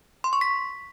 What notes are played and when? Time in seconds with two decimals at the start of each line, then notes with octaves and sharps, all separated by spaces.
0.24 C6
0.33 C#6
0.41 B6